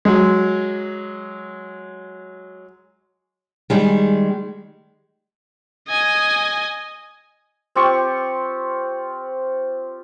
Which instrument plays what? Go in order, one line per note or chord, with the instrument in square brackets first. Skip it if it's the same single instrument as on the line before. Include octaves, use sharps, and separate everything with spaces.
[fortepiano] F#3 G#3
[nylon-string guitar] D#3 G3 G#3
[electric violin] D#5 G#5
[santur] C4 F4 G4 C#6